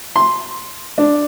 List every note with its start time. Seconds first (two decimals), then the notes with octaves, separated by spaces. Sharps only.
0.16 C6
0.98 D4